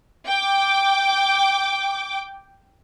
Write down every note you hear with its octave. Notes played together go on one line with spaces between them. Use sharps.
G5 D6